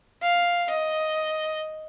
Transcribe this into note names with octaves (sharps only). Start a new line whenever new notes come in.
F5
D#5